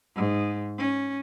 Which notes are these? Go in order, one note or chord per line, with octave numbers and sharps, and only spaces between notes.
G#2
C#4